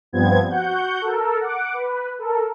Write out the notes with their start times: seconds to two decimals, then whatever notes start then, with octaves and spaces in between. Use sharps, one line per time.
0.13 G2 F3 B3 C4 G#6
0.50 F#4 F#5 G6
1.01 A4 A#4
1.41 F#5 D6
1.74 B4
2.19 A4 A#4